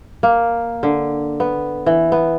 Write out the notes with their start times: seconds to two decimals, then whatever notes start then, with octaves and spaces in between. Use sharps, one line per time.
0.23 A#3
0.83 D3
1.40 B3
1.86 E3
2.12 B3